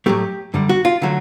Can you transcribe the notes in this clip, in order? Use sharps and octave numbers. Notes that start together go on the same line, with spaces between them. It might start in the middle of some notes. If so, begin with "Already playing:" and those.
A2 F#3 A3 G4
F#2 D3 G3
F#4
F4
D3 F#3 A3